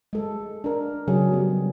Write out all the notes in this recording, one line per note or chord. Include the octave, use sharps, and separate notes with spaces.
G#3 A4
D4 A#4
C#3 F#3 G#4
G3 B3